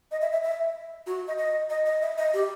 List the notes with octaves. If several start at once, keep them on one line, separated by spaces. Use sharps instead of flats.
D#5
E5
E5
E5
F#4
D#5
D#5
D#5
D#5
E5
D#5
G4